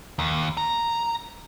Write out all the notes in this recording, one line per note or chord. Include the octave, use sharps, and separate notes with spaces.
D#2
A#5